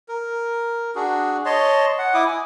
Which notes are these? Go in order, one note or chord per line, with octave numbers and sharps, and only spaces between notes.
A#4
D4 F#4 G#4
C#5 D#5 A5 C6
F#5
E4 D6 D#6
G#5